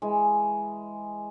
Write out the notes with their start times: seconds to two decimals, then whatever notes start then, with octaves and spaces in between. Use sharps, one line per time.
0.02 E3 G#3